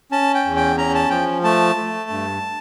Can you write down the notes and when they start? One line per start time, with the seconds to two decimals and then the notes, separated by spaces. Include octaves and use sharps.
0.12 C#4 A5
0.35 G5
0.45 E2
0.56 G5
0.78 C#4 A#5
0.94 A5
1.10 F3 G5
1.44 A3 A5
1.77 A3
2.10 G2